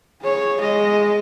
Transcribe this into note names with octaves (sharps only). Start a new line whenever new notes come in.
G#4 C#5
G#3 D#5